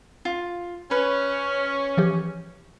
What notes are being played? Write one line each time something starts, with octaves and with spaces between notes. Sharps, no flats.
F4
C#4 B4
E3 F3 G4